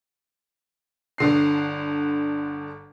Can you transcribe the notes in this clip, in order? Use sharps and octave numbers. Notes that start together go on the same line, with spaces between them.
G1 D3 C7